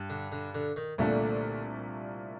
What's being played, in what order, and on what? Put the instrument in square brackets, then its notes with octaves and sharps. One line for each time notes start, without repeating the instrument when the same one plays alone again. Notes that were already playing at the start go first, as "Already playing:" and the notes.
Already playing: [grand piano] G2
[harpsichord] D3
D3
D3
D#3
[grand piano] C2 A#2 A3 D4 [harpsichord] D3